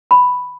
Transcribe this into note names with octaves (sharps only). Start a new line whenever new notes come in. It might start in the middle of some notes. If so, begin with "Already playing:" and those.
B5